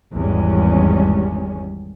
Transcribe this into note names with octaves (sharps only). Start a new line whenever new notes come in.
G#1 E2 G3 G#3 C#4